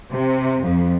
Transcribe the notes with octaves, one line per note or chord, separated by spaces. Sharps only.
C3
F2